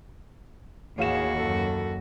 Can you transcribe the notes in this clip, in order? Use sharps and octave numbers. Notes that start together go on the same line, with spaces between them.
A1 D#2 F#4 G#4 F5 E7
F#2 A4